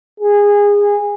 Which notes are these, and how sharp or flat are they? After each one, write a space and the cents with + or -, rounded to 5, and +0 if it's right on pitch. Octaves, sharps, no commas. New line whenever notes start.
G#4 -20